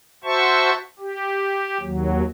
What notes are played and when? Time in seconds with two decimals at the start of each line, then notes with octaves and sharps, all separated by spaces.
0.24 F#4 C5 E5 A5 C#6
0.99 G4
1.80 D#2 F#3